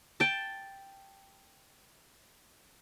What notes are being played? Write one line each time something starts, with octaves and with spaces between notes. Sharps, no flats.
G5 A5